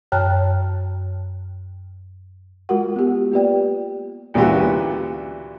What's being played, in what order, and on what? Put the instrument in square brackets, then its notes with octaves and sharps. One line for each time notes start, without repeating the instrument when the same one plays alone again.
[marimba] F#2 C#5 G5 A5 F6 F#6
[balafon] G#3 F4 F#4 A#4 F#5
B3 G4
A#3 F4 G4 B4 D5 G5
[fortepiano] D2 A#2 C#3 E3 F#4 G4